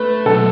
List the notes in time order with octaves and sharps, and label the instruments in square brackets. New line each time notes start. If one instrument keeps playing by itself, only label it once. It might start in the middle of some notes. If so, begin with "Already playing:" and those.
Already playing: [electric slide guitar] A3 [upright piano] B4
[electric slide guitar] B2 F#3 A3 [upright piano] A4